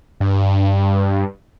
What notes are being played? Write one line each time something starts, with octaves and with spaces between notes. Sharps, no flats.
G2